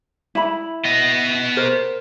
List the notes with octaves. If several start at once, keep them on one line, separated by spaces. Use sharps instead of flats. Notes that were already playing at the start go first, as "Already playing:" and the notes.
E4 B5
B3 D#5
A#4 C5